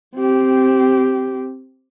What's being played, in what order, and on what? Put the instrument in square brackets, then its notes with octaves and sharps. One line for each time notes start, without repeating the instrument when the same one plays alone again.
[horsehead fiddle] C4 G4